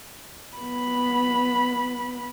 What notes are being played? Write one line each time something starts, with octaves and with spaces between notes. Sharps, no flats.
B3 B5